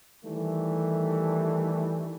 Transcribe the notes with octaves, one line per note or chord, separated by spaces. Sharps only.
D#3 E3 G3 A3